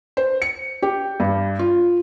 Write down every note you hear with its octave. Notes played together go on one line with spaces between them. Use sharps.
C5
C#7
G4
G2
F4